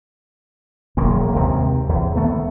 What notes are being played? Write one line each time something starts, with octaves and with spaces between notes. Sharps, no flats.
E1 F#2 D#3 A#3
D#2 C3 G#3 C4
E2
D#3 A3 B3